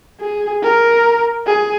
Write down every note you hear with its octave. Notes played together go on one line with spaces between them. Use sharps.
G#4
A#4
G#4